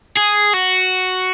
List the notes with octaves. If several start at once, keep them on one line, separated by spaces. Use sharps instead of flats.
G#4
F#4